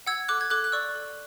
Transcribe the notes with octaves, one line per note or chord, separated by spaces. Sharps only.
F#5 E6 G#6
A4 D6 F#6
G#6
A4 D6 F#6
F#6
D5 C#6 E6
A4